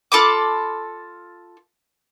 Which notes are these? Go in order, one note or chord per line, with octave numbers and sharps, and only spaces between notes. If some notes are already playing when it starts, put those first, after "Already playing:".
F4 A4 B5 D6